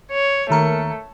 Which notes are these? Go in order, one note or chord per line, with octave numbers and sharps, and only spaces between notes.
C#5
D#2 A3 A#4 C#7